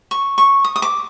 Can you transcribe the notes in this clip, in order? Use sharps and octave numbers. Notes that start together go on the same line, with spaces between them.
C#6
C#6
D#6
D#6
D6